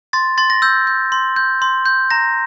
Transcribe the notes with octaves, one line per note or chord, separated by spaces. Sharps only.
C6 A6
C6 A6
A#6
E6 G6
G6
C6
G6
C6
G6
A#5 A#6